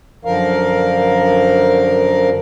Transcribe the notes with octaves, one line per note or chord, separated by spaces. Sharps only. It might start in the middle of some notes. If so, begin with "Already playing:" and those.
F#2 D3 F3 A#4 F5